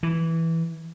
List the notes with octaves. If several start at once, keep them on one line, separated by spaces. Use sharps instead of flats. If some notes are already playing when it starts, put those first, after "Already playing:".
E3